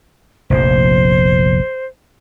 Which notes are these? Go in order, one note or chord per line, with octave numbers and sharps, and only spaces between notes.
F1 A#1 F2 C5